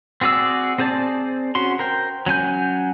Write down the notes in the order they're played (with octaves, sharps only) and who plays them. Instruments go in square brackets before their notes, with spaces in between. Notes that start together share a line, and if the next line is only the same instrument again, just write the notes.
[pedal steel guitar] C4 F#4 G#4 D5 E6
C4 G#4 C5 D5 A5
C#4 F#4 C6
A#4 C5 G5
F#3 C#4 G#5 G6